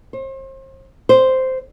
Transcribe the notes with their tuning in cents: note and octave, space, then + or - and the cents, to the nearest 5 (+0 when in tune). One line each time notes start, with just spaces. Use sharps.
C5 +40
C5 -5